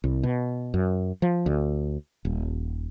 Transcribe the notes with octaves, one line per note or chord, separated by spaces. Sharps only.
C2
B2
F#2
F3
D2
D#1